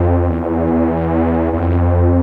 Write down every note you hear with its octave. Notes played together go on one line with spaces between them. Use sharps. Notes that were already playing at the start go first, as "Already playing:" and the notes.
Already playing: F2
E2
E2
F2